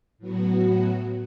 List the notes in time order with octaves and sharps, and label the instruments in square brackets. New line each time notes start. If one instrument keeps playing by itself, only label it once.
[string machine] A2 F#3 B3 F#4